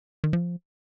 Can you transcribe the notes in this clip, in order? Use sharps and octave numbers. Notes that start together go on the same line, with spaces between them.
D#3
F3